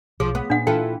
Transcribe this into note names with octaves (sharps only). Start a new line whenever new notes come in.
B1 F3 G#4
B3
A#2 D4 F#5
E3 F4 A4 G5